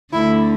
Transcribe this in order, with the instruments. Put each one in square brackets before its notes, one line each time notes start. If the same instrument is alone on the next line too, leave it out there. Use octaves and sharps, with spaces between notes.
[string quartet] D2 D3 A3 E4